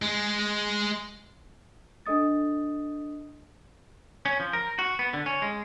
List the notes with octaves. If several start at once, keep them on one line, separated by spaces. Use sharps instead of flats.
G#3
D4 A4 D#5 D#6 A6
C#4
F3
A#4
F#4
B3
D3
C#4
G#3